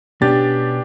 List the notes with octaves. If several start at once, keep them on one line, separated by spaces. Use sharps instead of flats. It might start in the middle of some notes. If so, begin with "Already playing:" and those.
B2 B3 C#4 D4 G4 A6